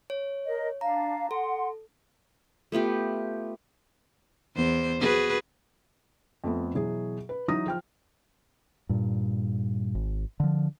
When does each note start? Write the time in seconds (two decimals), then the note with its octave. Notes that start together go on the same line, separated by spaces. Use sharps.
0.10 C#5
0.45 A#4 D#5
0.81 D4 F5 A#5
1.31 A4 F#5 C6
2.72 A3 B3 F4 G4
4.55 E2 C5
5.00 F#4 G#4 B4
6.44 F2 A3 B3
6.74 B2 E3 F#3 G#4
7.29 B4
7.48 E3 F#3 D#4 D#6 A#6
7.66 F3 G5 F6
8.89 G2 A#2
9.95 G#1
10.40 D3 F3